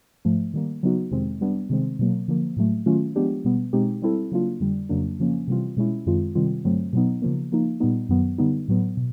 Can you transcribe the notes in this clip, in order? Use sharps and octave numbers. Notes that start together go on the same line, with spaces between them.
G#2 F3 A3
D#3 G3 A#3
C#3 F#3 B3 D#4 F#4
F2 C3 D#3 G#3 C4
G3 B3 D4
C3 D#3 G#3 C4
B2 F#3 A#3
D3 F3 A#3
A2 F#3 A3
D#3 F#3 A3 C#4 F4
F3 G#3 B3 D4 G4
B2 G3 B3
B2 G#3 C4 D#4 G4
G3 C4 E4 A4
C#3 F#3 A#3 D4 F4
F2 D3 G3
F2 C#3 F#3 A#3 D4
C#3 F3 A#3 C#4
C3 E3 G3 C4 F4
B2 G#3 C#4 E4
F#2 D#3 G#3 C4 F4
C3 D#3 G3 C4 F4
G2 D3 F#3 A3 C4
B2 F#3 B3 D#4
C#3 F3 A#3
F3 A#3 D#4
A#2 G3 B3 D#4
F#2 D#3 F#3 B3
D3 G3 B3 D#4
A2 F#3 B3
B2